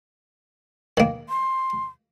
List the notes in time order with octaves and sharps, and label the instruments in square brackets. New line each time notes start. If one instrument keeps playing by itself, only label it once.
[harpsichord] D#3 A#3
[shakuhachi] C6